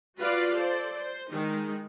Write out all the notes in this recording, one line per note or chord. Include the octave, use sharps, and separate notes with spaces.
F4 F#4 B4 D5 F5
A4 C5 D5
C5
D#3 G#3 D#4